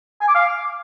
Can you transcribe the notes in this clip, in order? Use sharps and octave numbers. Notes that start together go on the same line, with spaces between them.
G#5
D6
F5